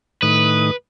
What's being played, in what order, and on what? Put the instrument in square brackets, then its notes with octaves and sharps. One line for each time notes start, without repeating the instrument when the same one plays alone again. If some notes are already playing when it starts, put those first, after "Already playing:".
[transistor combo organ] A2 D#3 D#6 [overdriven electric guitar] B4